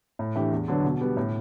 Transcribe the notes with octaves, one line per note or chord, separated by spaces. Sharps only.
A2
E3 A3 D4 G4
E2
D3 F#3 B3 D4
B2
G3 B3
A2